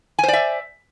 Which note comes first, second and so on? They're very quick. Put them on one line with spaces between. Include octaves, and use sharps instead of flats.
G#5 C5 D5 E5